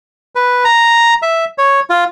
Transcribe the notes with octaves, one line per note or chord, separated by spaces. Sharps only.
B4
A#5
E5
C#5
F4